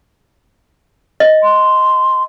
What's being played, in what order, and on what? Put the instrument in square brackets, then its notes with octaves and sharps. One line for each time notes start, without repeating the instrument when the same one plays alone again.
[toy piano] D#5
[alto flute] C6